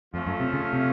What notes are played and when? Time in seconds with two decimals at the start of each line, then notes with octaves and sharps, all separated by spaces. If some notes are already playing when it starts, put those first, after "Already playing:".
0.14 F2 F3 A3 C#4
0.26 F#2
0.40 C3
0.53 C#3
0.73 C3